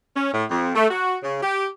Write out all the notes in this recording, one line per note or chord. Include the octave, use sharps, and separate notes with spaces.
C#4
A2
F2
A3
F#4
C#3
G4